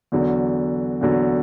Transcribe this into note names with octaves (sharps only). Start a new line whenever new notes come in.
E2 D3 F#3
E2 D3 F#3